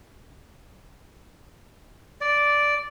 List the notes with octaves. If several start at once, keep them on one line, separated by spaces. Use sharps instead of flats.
D5